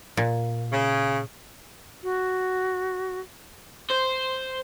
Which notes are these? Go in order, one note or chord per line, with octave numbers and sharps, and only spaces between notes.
A#2
C#3
F#4
C5